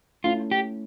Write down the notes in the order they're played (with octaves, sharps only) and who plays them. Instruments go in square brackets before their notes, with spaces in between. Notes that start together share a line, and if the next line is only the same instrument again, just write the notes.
[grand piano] A3 C#4 E4 [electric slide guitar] F4
[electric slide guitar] G4